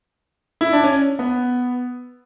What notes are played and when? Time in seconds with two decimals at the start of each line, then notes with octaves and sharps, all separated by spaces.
0.61 E4
0.73 D4
0.84 C#4
1.19 B3